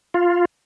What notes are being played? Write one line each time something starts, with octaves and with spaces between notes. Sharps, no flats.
F4